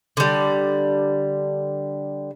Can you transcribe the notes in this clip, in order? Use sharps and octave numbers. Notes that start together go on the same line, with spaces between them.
D3 G3